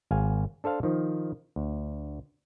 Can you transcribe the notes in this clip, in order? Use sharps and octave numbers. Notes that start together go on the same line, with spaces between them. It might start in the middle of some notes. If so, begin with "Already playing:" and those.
G#1 F5 G#5
D4 A4 C5 F5
D#3 F3
D2